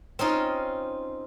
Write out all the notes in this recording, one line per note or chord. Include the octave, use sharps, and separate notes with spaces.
C4 C#4 D#4 F4